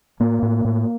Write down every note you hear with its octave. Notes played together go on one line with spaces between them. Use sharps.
A2 A#3
A2
A2